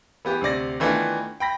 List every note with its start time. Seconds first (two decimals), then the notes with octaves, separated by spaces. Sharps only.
0.25 E3 B3 G4
0.42 D2 C3 D5 A#6
0.80 D#3 E3 A3 B3 D4 F4
1.40 G5 B5 A#6 B6